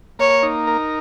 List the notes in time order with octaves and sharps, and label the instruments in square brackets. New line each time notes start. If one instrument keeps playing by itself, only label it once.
[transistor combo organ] A#3 [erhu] C#5
[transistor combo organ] D#4
A#4